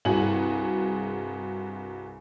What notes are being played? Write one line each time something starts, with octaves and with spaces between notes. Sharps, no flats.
C2 G2 F#4 G#4 G#5 F#7